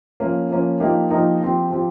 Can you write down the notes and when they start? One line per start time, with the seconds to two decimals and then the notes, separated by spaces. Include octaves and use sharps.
0.20 F3 A#3 C#4
0.50 F3 A#3 C#4
0.80 F3 A#3 D#4 G4
1.11 F3 A#3 D#4 G4
1.41 F3 C4 G4
1.70 F3 C4 G4